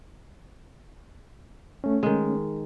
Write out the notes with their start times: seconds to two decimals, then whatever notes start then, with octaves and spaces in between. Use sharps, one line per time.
1.84 A3 C#4
2.03 D#3 G#3